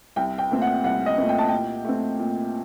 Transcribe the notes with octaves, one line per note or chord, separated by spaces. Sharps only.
C2 G5
G5
A#2 A3 C4
F#5
C2 F#5
D#5
A#2 A3 C4
G5
A5
A#2 G5
A3 C4
A#2